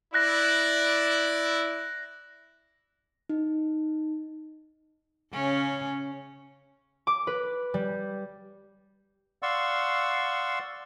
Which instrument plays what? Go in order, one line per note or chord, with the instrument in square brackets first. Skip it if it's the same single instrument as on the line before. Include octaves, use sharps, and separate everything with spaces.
[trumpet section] E4 D5 [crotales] F#6 A#6
[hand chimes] D#4
[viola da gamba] C#3 C#4
[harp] D6
B4
G3
[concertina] D5 F5 F#5 C6 C#6 E6